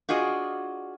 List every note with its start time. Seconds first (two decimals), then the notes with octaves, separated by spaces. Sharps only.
0.09 D4 F4 F#4 G#4 D#5